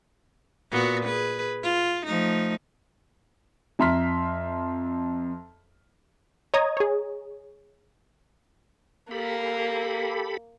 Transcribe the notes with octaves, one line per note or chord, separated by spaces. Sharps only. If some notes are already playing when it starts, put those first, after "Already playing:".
A#2 B3 F#4
G#4 B4
F4
F3 A3 D#4
F2 E5 A#5 C6 F6 B6
C#5 D#5 A#5 D#6 G#6
G#4 C#5
A#3 G4 A4 B5